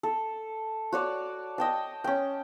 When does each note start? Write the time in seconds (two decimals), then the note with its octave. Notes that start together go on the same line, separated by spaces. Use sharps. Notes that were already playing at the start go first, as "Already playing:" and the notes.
0.03 A4
0.92 F#4 C#5 D5
1.58 D#5 G5 A5
2.04 C#4 G5